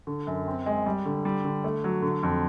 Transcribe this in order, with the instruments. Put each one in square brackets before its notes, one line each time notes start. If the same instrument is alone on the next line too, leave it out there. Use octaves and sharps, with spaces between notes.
[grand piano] D3
F#2
C4
G#3
G3
D3
G3
D3
A3
F#3
D3
F2